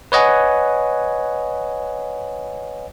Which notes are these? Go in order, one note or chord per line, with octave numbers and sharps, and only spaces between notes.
B4 C#5 D#5 F#5 G#5